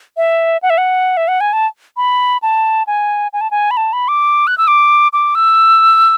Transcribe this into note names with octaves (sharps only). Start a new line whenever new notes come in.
E5
F#5
E5
F#5
E5
F#5
G#5
A5
B5
A5
G#5
G#5
A5
G#5
B5
A5
B5
D6
F#6
E6
D6
D6
E6